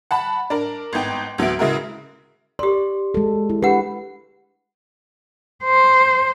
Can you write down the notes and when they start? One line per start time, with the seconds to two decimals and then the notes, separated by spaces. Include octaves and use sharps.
0.11 F#5 A5 B5
0.50 D4 A#4
0.93 G#1 B3 D#4 G5
1.38 D2 F#3 B3 E5 D7
1.59 C#3 G#3 E4 F#4 A#4
2.59 G4 D5 C6
3.14 G#3 A4
3.50 E4
3.63 D4 G4 B4 F#5
5.65 C5